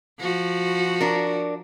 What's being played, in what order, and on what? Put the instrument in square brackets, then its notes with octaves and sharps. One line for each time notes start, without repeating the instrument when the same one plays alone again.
[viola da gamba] F3 F#4
[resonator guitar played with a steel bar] D4 A#4